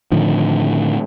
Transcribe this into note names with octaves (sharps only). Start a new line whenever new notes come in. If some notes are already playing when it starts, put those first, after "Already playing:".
A2 D3 D#3 F3